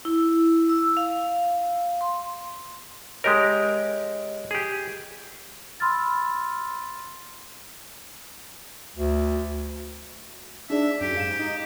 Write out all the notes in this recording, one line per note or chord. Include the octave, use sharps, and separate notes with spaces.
E4
E6
F5
C6
G#3 G4 A#4 C#5 D#5
G4 G#4
B5 C6 E6 F6 A6
D2
D4 D#4 G#4 D5 E5
F#2 G4
G#2 F5 E7
D#4